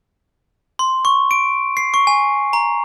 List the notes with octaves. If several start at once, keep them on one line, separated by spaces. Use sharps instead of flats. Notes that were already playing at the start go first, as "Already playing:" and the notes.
C6
C#6
D7
C7
C#6
G#5
A#5